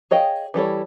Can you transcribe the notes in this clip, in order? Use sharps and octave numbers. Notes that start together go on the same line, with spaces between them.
G#4 C#5 D#5 F5 G5
E3 G3 A4 C#5